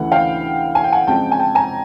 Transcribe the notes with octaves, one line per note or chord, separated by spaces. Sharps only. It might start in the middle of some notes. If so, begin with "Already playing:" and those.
Already playing: D2 C#3 E3 A3 F#5
F5 G5
G#5
G5
F#5 G#5
F2 C#3 F3 G#3 G5 A5
G#5
G5 A5
G#5 A#5